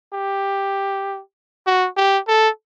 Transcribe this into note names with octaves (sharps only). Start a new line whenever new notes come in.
G4
F#4
G4
A4